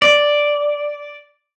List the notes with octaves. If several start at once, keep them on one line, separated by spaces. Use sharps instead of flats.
D5